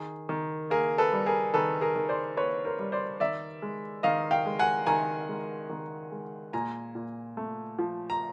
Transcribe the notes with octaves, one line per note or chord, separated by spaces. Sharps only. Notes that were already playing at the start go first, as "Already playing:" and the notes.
Already playing: D#3 G#4
D#3
A#3 G#4 A#4
A4 B4
G3
G#4 A#4
D#3 A4 B4
G#4 A#4
D#3
C5 D5
A#3 B4 C#5
A#4 C5
G3
C5 D5
D#3 D5 E5
G#3
D#3 D#5 F5
F5 G5
G#3
F#5 G#5
D#3 G#5 A#5
G#3
D#3
G#3
A#2 G#5 A#5
A#2
A3
F3
A#5